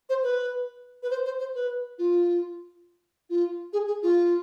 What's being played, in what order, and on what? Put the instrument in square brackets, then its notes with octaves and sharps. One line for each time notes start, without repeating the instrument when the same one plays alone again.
[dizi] C5
B4
B4
C5
C5
C5
B4
F4
F4
G#4
G#4
F4